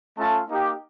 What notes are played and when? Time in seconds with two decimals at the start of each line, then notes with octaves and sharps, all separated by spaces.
0.17 A3 C#4 F4 A5
0.49 A#3 D#4 G4